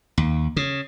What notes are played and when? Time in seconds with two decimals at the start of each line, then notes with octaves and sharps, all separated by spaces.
0.18 D#2
0.57 C#3